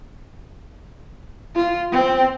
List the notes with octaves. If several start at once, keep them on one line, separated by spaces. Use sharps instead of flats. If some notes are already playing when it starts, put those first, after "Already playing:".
F4
C4